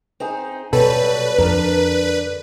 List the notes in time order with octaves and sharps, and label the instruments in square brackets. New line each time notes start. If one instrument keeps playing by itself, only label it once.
[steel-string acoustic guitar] C4 D#4 G#4
[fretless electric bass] B2 [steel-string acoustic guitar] F#3 G3 [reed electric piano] A4 [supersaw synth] B4
[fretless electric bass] F2 [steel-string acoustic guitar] D3 D4 A#4